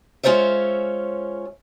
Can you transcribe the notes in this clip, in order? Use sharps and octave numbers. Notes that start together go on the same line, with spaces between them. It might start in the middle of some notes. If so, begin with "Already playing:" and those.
G#3 C#4 F4 C5 C#5 E5